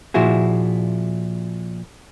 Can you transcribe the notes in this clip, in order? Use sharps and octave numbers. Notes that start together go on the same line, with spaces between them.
A#2 F3 E4 F#4 G#4